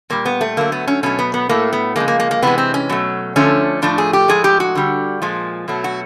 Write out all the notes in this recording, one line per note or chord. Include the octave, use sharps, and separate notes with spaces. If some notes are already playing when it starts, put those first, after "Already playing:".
A#2 G3 A#3
B3
A3
D3 F#3 A3 A#3
B3
C#4
B2 F#3 A3 C#4
B3
B3
A2 F#3 A3 A#3
B3
C#3 F3 G#3 A#3
A#3
A#3
A#3
C3 E3 G#3 B3
C4
C#4
B2 F#3 A3
D3 F3 A3 C#4
A2 F3 A3 D4
G#4
G4
A2 F3 G#3 G#4
G4
F#4
D3 G3
A#2 F3 G#3
B2 F#3 A3
F#4